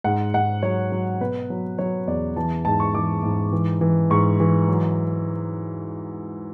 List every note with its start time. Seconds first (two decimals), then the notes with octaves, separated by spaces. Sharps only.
0.04 G#2 F#5
0.34 G#2 F#5
0.63 F#3 C#5
0.92 F#3
1.21 B2 B4
1.50 F#3
1.78 F#3 C#5
2.07 E2 D5
2.36 E3 A5
2.65 G#2 A5
2.80 C#6
2.95 E3 D6
3.23 G#2
3.52 E3
3.81 E3
4.10 G#2 C#6
4.40 E3
4.68 F#3